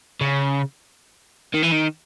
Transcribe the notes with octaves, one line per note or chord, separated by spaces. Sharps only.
C#3
D#3
E3
D#3